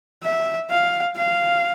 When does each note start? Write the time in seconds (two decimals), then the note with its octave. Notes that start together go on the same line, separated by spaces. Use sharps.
0.23 E5
0.70 F5
1.16 F5